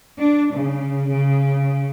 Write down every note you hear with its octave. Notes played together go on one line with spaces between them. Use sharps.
D4
C#3
C#3